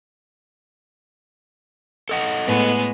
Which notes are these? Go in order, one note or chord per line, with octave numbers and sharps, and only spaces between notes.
A4 D#5 F#5
A2 G#3 B3